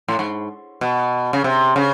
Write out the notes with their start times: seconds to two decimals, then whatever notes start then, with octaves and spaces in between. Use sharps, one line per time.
0.08 A2
0.19 G#2
0.81 B2
1.33 C#3
1.44 C3
1.76 C#3